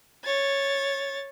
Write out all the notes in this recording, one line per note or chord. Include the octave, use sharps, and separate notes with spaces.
C#5 A6